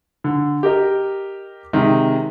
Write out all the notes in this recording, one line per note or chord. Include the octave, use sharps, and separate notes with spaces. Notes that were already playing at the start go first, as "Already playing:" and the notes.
D3
G4 A#4 D#5
C3 D#3 G#3